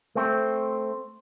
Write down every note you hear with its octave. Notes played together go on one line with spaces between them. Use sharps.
A3 C4